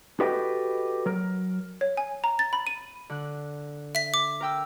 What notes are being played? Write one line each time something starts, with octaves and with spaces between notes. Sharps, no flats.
F#4 G4 A4 B4 D#5 G5
F#3 A#4
C#5
G#5
A#5
A6
B5
D#7
D3 F#6
E5 B6
D6
A#4 G5 E6